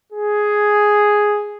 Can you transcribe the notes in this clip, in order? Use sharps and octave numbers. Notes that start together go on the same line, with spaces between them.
G#4